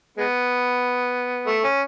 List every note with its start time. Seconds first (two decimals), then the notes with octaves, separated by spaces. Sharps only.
0.17 G#3 B3
1.47 A3
1.64 C#4